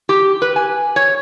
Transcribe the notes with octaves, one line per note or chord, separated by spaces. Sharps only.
G4
B4
G#5
C#5